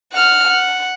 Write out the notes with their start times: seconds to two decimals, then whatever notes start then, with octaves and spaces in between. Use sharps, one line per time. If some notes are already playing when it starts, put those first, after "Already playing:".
0.13 F#5 F6
0.48 F#5